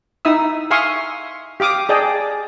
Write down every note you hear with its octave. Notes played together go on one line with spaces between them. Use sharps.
D#4 E4 E5 D#6 E6
E5 F5 G#5 C6 C#6 D#6
G4 F5 D6 D#6
G#4 D5 D#5 G5 A5